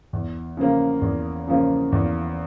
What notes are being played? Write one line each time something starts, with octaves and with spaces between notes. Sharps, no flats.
E2
C#3 F3 A#3
E2
C#3 F3 A#3
E2